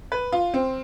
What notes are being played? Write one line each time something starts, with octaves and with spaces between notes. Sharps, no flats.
B4
F4
C4